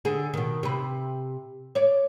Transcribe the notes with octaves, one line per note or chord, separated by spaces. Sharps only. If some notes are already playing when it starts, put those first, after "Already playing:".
D3 G#4
B2 D#3
C3 B4
C#5 D5